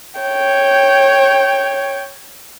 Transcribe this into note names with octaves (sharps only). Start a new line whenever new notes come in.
C#5 G5